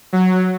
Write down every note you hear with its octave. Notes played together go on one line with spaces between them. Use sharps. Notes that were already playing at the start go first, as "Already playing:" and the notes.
F#3